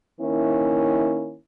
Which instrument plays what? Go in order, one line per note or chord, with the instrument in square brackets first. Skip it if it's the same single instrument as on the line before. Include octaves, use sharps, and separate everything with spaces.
[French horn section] D#3 A#3 C#4 E4